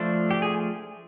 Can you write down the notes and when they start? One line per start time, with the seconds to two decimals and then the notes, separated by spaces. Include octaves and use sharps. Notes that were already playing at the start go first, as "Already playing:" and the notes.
Already playing: F3 A3 D4
0.31 G4
0.42 G#4